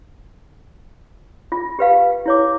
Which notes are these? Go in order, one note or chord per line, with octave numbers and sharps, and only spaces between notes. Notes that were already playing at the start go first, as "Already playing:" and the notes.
F4
G4 B4 F5
E4 C#5 D6